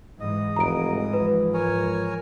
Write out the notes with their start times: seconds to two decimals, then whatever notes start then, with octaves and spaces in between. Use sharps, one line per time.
0.20 G#2 E3 D#5
0.56 F1 A#5 D7
1.13 F3 B4
1.54 A#4 C#5 G#5